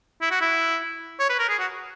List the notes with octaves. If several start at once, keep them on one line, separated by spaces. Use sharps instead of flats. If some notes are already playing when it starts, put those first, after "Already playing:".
E4
F#4
E4
C#5
B4
A#4
G#4
F#4